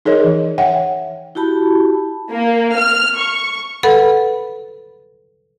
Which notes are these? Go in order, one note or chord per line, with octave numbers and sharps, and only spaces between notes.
D#4 G#4 A#4 C#5 D#5
E3
C#5 E5 F#5 G5
E4 F#4 G4 A5 B5
A#3
F6
C#6
A4 B4 F#5 B5